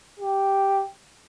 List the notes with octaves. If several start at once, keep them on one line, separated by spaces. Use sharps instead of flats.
G4